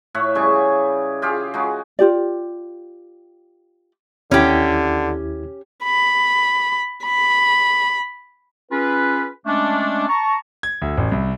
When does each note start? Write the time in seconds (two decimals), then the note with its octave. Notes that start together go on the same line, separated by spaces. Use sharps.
0.14 A2 C#5 E5 F#5
0.35 C#3 G3 G#4 C#6
1.22 F4 G4 G#4 F5
1.54 G#3 D#4 F#4
1.99 F4 G4 D5
4.31 D#2 D3 C#4 E4 G4 G#6
5.84 B5
7.04 B5
8.70 C#4 F4 G#4 B4
9.45 G#3 A3 C#4 D4
10.07 A5 A#5 C#6
10.63 G#6
10.82 D2
10.98 A1
11.12 C2